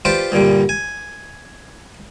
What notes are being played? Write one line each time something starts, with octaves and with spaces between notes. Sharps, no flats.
F4 G4 B4 C5 D5
G2 A#2 D3 G3
G#5